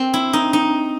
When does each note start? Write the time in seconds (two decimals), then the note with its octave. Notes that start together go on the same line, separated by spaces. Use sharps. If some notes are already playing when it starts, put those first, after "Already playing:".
Already playing: C4
0.14 E4
0.33 D#4
0.53 D#4